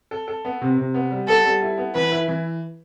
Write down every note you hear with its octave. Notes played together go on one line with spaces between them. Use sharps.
A4
A4
B3
C3
C3
B3
G3
B3 A4
G3
E4
B3
E3 B4
E4
E3